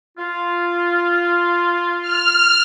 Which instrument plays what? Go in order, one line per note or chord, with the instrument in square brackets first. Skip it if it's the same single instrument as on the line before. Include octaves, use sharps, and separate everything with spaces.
[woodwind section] F4
[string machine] F6